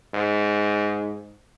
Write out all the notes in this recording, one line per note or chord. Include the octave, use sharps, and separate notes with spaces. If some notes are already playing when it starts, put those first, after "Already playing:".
G#2